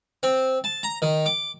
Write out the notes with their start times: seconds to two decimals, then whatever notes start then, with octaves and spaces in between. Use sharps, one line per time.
0.23 C4
0.64 A5
0.83 A#5
1.02 D#3
1.26 D6